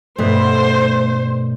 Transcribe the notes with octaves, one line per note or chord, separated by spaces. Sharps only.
G2 B2 A3 B3 C5